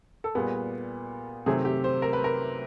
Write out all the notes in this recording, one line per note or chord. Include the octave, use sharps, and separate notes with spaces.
A4
A#2 G3 B3 G#4
C3 D#3 F#3 A3 C4 G#4
G4
C5
A#4
B4
A#4